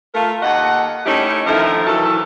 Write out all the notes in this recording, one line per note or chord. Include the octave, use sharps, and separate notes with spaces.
A3 F4 A#4
D#2 A4 D#5 F#5
G3 A3 C#4 D#4 E4 G4
D3 D#3 F3 A3 E4 A#4
D#3 E3 F#3 A4